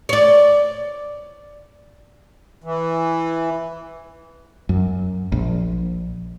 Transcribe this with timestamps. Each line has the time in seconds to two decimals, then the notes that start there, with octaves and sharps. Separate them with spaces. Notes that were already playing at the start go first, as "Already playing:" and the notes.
0.09 C#5 D5
2.64 E3
4.69 F#2
5.32 A#1